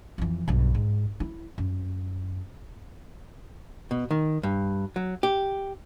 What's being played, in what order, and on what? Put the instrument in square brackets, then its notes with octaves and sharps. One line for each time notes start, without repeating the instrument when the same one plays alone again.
[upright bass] F2 E3
B1 G2
G#2
E4
F#2
[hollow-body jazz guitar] B2
D#3
G2
F#3
G4